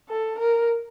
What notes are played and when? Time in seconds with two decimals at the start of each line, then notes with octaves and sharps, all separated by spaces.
0.09 A4
0.39 A#4